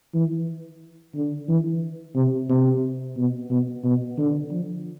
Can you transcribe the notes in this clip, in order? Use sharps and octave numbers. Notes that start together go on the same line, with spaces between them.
E3
D3
E3
C3
C3
B2
B2
B2
D3
F3